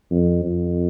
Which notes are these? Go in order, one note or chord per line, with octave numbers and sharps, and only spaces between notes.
F2
F2